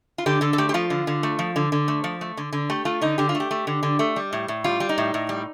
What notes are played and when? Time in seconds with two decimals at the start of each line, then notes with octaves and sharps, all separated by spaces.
0.18 F4
0.26 D3 G4
0.41 D3 A4
0.53 A4
0.58 A3 G4
0.69 G4
0.74 F3 F4
0.90 D3
1.07 D3
1.23 A3
1.39 F3
1.56 D3
1.72 D3
1.88 A3
2.04 F3
2.21 A3
2.37 D3
2.53 D3
2.70 A3 G4
2.85 A3 F4
3.01 D3 D#4
3.18 D3 G4
3.29 F4
3.35 A3
3.40 G4
3.51 A3
3.67 D3
3.83 D3
3.99 A3
4.16 G3
4.33 A2
4.48 A2
4.64 G3 F4
4.80 G3
4.89 D#4
4.98 A2
5.14 A2
5.29 G3